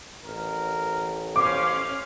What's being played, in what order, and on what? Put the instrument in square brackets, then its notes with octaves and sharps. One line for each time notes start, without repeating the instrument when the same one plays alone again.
[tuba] A1 [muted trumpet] A#4
[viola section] C#4 F5 [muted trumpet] C5 [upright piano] D6